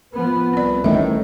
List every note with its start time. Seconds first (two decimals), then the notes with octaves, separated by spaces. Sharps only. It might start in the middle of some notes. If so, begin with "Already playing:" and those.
0.14 F3 B3 B4
0.53 C2 C4 D5
0.84 A1 A2 D#3 D#5 E5